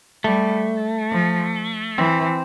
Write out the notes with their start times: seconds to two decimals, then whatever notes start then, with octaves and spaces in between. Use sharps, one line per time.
0.24 G3 A3
1.11 F3
1.98 E3 C4